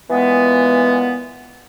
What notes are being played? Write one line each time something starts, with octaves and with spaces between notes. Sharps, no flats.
A#2 E3 G#3 B3